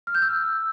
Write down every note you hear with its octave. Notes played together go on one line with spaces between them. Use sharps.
F6
G6
E6